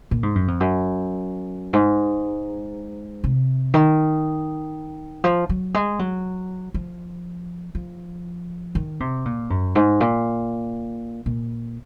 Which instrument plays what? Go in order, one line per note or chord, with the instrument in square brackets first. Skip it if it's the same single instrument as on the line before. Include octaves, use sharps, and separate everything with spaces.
[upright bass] A#2
G#2
F#2
F2
F#2
G#2
C3
D#3
F3
F#3
G#3
F#3
F3
F3
D#3
C3
A#2
F#2
G#2
A#2
A#2